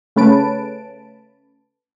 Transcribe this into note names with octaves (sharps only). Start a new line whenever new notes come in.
C#3 A3 C#4 B4 A5 D7